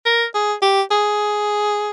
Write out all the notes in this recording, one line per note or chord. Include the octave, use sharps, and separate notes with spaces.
A#4
G#4
G4
G#4